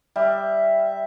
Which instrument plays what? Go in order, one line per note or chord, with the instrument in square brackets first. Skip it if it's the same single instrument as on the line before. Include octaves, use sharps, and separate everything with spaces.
[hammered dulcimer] G3 [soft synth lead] E5